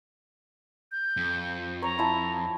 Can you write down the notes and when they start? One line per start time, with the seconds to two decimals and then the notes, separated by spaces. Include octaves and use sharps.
0.92 G6
1.17 F2
1.82 C#5 A#5
1.99 E4 A5